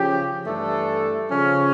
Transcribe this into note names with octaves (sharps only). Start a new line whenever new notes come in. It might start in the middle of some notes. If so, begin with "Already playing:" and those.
Already playing: C#3 F3 C#4 G4
G2 E3 A3 D4 A4
C#3 F3 C#4